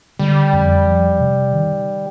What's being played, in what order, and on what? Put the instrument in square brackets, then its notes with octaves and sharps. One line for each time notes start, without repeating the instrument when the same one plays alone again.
[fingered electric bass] D3 [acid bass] G3
[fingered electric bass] F2
F3
C3
D#3